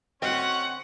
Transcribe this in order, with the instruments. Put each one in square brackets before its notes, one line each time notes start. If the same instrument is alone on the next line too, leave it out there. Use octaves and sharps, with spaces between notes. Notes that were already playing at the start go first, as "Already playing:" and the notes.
[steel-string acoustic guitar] D3 F#4 D#5 [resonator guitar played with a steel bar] C4 [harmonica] C#4 C#6 [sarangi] F#5